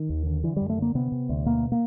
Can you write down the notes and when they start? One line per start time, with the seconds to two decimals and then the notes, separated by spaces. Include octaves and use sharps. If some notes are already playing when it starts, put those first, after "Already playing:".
Already playing: D#3
0.10 D#2
0.27 D3
0.43 D3 E3
0.56 G3
0.61 F#2
0.69 A3
0.78 D3 A#3
0.95 C3 B3
1.12 C3
1.29 D2
1.46 B2 A#3
1.72 A#3